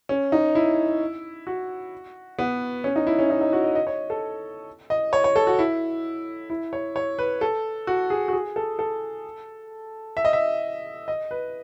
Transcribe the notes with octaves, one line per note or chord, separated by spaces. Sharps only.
C#4
D#4
E4
F#4
B3
C#4
D#4
E4
C#4
D#4
D#4
F#4
D#5
D#5
C#5
A4
D#5
C#5
C#5
A4
F#4
E4
E4
C#5
C#5
B4
A4
F#4
G#4
F#4
G#4
A4
A4
E5
D#5
E5
D#5
B4